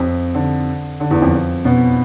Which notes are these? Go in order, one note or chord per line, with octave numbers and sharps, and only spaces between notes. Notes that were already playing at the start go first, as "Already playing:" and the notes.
Already playing: F2 F3
D3
D3
E2 E3
F2 F3
B2 B3